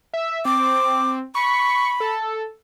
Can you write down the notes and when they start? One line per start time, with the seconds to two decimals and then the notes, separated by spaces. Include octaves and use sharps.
0.14 E5
0.45 C4 D6
1.35 B5 C#6
2.00 A4